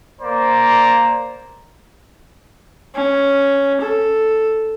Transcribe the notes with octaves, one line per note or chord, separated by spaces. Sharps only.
A#3 C5 D5 A#5
C#4
A4